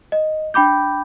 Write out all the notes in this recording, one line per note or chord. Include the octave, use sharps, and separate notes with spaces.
D#5
D4 G5 B5 D6 G6